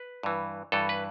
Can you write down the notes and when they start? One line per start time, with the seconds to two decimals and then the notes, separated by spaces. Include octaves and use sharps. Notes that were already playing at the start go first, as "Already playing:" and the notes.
Already playing: B4
0.23 G2 E3
0.72 G2 E3 A4
0.89 B4